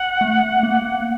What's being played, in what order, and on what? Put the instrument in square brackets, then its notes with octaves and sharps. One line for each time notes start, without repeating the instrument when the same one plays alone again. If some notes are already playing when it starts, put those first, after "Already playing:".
Already playing: [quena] F#5
[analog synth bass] A3
A#3